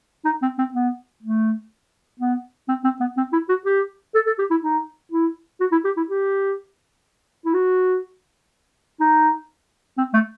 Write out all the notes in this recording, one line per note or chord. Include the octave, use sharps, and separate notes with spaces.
D#4
C4
C4
B3
A3
B3
C4
C4
B3
C4
E4
F#4
G4
A4
A4
G4
E4
D#4
E4
F#4
E4
G4
E4
G4
E4
F#4
D#4
C4
A3